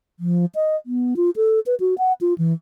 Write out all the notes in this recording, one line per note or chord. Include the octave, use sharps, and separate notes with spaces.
F3
D#5
B3
F4
A4
B4
F#4
F#5
F4
E3